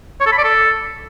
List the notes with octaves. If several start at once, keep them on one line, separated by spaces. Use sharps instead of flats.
C#5
A4
B5
D5
A4